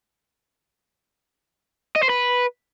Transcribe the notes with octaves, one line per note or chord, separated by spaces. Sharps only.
D#5
C5
B4